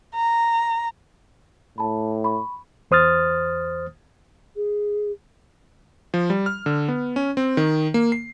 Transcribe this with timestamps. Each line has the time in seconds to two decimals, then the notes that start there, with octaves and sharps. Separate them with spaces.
0.15 A#5
1.78 A2 A5 B5
2.24 B5 C#6
2.91 E2 C5 D#6 F6 A6
4.56 G#4
6.14 F3
6.30 G3
6.46 F6
6.66 D3
6.88 B3
7.16 C#4
7.37 C4
7.57 D#3
7.94 A#3
8.12 C7